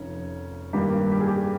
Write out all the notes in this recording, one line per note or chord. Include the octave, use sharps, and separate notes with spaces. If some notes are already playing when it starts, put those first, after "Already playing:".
Already playing: F1 C#4 D#4
G2 D#3 A#3 G4
G4
G#4
G4